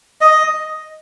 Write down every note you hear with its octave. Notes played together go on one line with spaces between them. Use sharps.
D#5